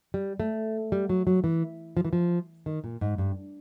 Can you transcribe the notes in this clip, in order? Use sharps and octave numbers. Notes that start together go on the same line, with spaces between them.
G3
A3
G3
F#3
F#3
E3
F3
E3
F3
D#3
A#2
G#2
G2